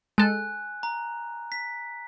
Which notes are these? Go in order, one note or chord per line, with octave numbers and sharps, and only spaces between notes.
G#3 A4 G#5 F#6
A#5
B6